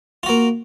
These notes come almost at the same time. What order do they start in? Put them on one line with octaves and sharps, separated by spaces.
F4 F#4 A#3